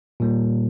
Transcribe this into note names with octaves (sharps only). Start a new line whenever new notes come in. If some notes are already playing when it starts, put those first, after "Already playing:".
A#2 G3 A#3